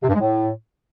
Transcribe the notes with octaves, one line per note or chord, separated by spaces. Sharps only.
C3
G2
G#3
A2